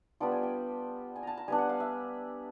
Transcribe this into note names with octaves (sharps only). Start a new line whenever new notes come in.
G3 B3 D4 F4 G5
G#5
G5
G#5
A5 A#5
A#5
G3 B3 D4 G#5
F#5
F5
E5